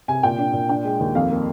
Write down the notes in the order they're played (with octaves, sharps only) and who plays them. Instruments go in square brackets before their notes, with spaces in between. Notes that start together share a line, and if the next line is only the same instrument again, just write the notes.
[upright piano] C3 G#5
A#2 G5
D4
A#2
D4 G5
G#3
D#2
F2 F5
A#3